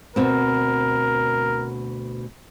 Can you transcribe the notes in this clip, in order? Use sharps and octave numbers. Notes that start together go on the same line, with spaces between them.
D2 B2 C4 A#4